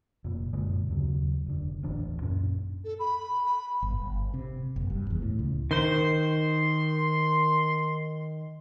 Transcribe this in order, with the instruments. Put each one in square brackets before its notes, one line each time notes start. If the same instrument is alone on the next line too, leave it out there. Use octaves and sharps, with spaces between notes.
[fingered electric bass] F1 A#2
F#2 A#2 D3 G#3
D#2 C#3 F#3
F1 D3
D#1 A1 E3 D4
F#2 A#2 C#4
[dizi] A4
B5
B5
[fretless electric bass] G1
G1
C3
F#1
G2
E2
A2
C#2
[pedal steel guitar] D#3 C5 [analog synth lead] C6